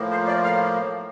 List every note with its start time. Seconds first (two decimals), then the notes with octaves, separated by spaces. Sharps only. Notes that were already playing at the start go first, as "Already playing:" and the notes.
Already playing: A2 F3 A#3
0.11 C5
0.27 D5
0.44 F5